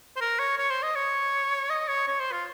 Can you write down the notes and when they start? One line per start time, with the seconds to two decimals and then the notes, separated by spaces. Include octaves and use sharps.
0.16 C5
0.21 A#4
0.39 C#5
0.58 C#5
0.70 C5
0.83 D#5
0.95 C#5
1.69 D#5
1.88 C#5
2.08 C#5
2.20 C5
2.32 F4